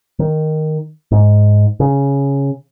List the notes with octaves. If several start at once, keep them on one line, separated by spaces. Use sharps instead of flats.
D#3
G#2
C#3